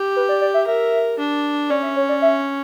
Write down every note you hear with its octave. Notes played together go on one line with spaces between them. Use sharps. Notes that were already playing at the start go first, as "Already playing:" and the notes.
Already playing: G4
B4
D5
D5
E5
A#4 E5
D4
C#4 D5
E5
C#5
D5
E5